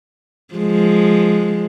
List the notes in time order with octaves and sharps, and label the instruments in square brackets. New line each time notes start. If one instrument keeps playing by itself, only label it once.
[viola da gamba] F3 G#3